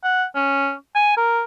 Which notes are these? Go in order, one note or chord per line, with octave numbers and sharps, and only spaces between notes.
F#5
C#4
G#5
A#4